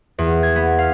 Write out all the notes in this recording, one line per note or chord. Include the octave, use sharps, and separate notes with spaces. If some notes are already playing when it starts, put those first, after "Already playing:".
E2
G#6
B3
F5